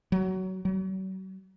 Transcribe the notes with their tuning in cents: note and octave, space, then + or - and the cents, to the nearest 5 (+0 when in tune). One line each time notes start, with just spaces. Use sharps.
F#3 +20
F#3 +40